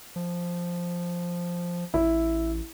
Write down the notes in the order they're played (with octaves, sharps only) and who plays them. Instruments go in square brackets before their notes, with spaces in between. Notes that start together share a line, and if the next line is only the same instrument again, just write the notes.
[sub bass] F3
[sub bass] A1 [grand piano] E4